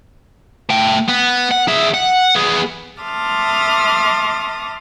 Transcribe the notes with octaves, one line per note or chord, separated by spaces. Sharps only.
A3 G5
B3
F#5
G#4 E5
F#5
B3 G#4
E5 A5 C6 D6 D#6 F6